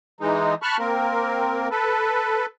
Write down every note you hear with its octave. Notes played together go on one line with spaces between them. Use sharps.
E3 G#3 D#4
A5 B5 C#6 F6 F#6
A#3 C4 A#4
A4 B4